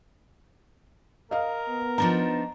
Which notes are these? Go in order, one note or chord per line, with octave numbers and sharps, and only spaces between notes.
A#4 D#5 F5
B3
F3 D4 D#4 A#5